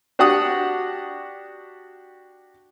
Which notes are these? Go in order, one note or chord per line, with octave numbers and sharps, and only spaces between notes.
D4 F#4 G4 F#5 D#6